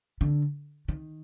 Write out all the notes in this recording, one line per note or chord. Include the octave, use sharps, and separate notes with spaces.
D3
D#3